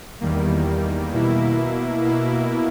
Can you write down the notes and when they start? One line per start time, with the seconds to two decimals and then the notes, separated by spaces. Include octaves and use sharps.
0.20 E2 D#3 G3 A#3
1.13 B2 A#3 E4
2.04 B2 A#3 E4